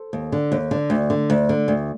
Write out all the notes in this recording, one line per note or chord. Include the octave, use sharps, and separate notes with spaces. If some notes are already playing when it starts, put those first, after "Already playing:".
Already playing: A4 C5
D#2
D3
D#2
D3
D2
D3
D2
D3
D2